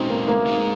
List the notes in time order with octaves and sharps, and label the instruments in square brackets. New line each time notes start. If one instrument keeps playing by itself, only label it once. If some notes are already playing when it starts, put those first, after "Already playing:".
Already playing: [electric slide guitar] G#3 C#4 F#4 [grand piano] C4 D#4
[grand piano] A#3
A#3
[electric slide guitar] G#3 D#4 G#4